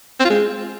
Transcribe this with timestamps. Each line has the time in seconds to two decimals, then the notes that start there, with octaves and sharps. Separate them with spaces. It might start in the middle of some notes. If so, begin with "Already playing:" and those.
0.20 C4
0.25 F4
0.30 G#3